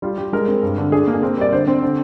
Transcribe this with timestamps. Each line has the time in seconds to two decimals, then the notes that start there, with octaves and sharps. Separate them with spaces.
0.02 G3 F4
0.18 G3 G4
0.33 G#3 A#4
0.48 C4
0.63 G2
0.78 D3
0.92 D4 G#4
1.08 A#3
1.14 G#4
1.22 C4 A#4
1.37 G3 D5
1.52 D3 C5
1.67 C4
1.82 D3